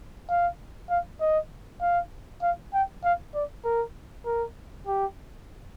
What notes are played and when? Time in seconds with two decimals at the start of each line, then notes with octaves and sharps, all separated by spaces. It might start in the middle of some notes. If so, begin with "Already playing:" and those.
0.29 F5
0.90 F5
1.20 D#5
1.81 F5
2.42 F5
2.73 G5
3.04 F5
3.34 D5
3.64 A#4
4.25 A#4
4.87 G4